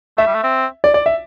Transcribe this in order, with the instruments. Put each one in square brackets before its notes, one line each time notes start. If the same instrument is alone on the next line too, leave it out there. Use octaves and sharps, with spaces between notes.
[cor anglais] A3 [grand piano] E5
[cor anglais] G3
A3
C4
[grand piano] D5
D5
E5